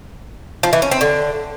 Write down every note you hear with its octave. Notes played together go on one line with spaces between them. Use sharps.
F3
E3
C#4
C4
D3